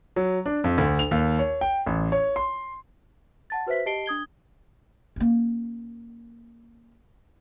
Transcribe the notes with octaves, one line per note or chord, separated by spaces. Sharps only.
F#3
D4
F2
D2
F7
D#2
C#5
G5
A1
C#5
C6
F#5 A5 A6
F#4 B4 C5 E5 B6
G4 D#5 A5 C7 D7 G7
D4 D#6 G#6 G7
A#3 C#4